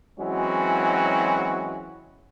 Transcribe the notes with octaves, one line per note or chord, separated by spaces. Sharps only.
E3 F#3 G#3 C4 C#4 F#4